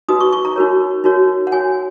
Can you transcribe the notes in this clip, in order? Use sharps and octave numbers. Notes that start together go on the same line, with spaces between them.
D#4 F#4 B4 D#6
C#6
C#6
A#5
D#4 F#4 A#4 C#5
D#4 F#4 A#4 C#5
F#5
F#4 C#5 G#5